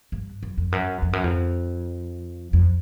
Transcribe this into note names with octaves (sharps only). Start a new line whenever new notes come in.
G2
F#2
F2
F#2
F2
F#2
F2
F2